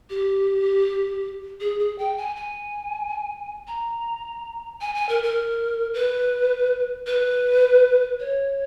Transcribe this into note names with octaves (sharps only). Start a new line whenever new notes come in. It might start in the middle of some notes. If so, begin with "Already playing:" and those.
G4
G#4
G#4
G5
G#5
G#5
A#5
G#5
G#5
A#4
A#4
B4
B4
C#5